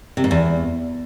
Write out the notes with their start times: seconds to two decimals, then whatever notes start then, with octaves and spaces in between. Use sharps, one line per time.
0.17 C3
0.24 G#2
0.31 E2